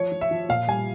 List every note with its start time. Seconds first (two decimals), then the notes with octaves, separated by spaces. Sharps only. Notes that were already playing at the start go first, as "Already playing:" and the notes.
Already playing: F3 C#5
0.12 F3
0.21 E5
0.31 F3
0.49 A#2 F5
0.68 G3 G#5